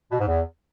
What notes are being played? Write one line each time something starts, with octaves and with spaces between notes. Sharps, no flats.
B2
G#2
E2